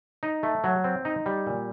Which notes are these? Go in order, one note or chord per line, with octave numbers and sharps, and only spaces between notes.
D#4
A3
F#3
C4
D#4
G3
A#2